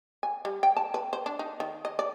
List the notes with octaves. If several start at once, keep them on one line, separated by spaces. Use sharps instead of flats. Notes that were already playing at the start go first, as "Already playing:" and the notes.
G#5
G3
G5
A5
B4
C5
D4
D#4
D#3
D#5
D5